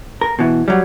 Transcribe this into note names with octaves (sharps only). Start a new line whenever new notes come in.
A#4
B2 E3
F#3 G3